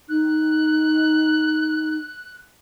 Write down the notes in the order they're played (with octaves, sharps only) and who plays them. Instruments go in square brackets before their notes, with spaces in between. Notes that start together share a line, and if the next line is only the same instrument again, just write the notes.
[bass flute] D#4 [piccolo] F#6